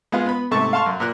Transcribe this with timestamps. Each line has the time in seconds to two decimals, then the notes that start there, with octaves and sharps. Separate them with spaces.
0.12 G#3 B3 F4
0.26 B3 B5
0.51 G#2 C3 A3 A4 A5 C#6
0.73 F5 A5 C6 C#6 F6
0.86 F#2
1.00 A#2 A#4 F#6